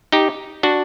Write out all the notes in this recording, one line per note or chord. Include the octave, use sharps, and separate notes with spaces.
D#4 G4
D4 F#4